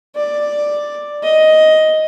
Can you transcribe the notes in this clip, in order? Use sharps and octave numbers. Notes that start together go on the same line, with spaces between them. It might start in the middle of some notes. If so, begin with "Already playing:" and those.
D5
D#5